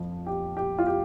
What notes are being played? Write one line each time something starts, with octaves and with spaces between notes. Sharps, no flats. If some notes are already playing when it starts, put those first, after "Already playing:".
Already playing: F2 F3 F4
G4
G4
F4
G4